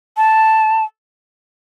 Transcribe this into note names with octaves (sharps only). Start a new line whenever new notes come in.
A5